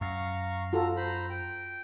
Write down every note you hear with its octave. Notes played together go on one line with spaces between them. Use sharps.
F#2 F5 A#5 C#6
F4 F#4 A4 A#5
C5 A#5 B5
G5